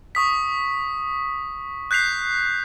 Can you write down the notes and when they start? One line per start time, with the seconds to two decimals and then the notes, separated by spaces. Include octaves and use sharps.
0.15 C#6 D#6 B6
1.91 F#6 G6 B6 C7 F7